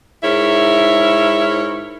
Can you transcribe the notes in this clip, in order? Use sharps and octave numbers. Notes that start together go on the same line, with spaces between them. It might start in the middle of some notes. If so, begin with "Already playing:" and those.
G#2 E4 A#4 C#5 E5